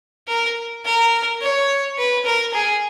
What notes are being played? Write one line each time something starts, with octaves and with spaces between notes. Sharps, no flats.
A#4
A#4
C#5
B4
A#4
G#4